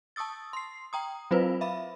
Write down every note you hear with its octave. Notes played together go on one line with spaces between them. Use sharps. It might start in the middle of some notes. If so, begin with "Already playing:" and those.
A5 C#6 D#6 E6 A6
C6 C7
G5 A#5 D#6
F#3 C4 F4 B4 C5
E5 F5 B5